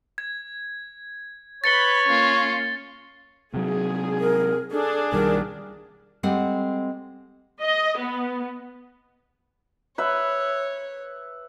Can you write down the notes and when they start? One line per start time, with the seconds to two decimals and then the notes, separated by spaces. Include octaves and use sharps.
0.18 G#6
1.64 B4 C#5 B5 A6 C#7 G7
2.06 A#3 C#4 F4
3.54 C3 F#3 G#4
4.20 A#4
4.71 D4 G#4 A4
5.12 B1 D#3 G3 A#4
6.23 G3 G#3 C4 A4 F#5
7.61 D#5
7.97 B3
9.98 B4 C#5 E5